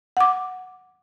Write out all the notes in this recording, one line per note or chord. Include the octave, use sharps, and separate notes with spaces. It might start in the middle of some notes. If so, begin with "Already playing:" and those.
F#5 D6